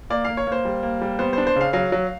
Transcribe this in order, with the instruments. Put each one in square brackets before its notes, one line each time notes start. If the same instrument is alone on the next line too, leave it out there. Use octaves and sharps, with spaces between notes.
[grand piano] A#3 D5
A#3 F5
C#5
A#3
C5
G3
A#3
G3
B3 C5
D4 C5
C5
C#3 F5
F#3 F5
F#3